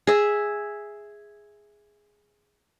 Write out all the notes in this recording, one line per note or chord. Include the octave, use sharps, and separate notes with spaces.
G#4 E5